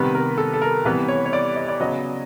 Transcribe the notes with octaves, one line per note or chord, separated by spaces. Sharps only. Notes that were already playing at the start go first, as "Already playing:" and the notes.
Already playing: C3 D#3 G3 B3 B4
A#4
A4
A4
A#4
C3 E3 G3 B3 B4
C#5
C#5
D5
D#5
D5
C#3 F#3 B3 D#5